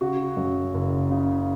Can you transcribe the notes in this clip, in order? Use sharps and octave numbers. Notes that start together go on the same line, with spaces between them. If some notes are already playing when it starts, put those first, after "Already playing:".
C#3 F#4
F#2
F#1
C#3